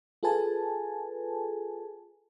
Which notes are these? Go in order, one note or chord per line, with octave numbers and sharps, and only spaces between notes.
F4 G#4 A4 B4 G#5 A5